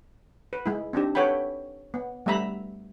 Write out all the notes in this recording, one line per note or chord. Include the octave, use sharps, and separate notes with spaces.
B4
G#3 E4
C4 D4 D#4 G4
A4 B4 C#5 F#5 G5 B5
B3
G3 A3 B3 E5 A#5 B5